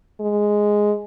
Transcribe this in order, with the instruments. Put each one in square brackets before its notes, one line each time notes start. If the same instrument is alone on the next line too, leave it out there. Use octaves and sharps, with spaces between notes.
[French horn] G#3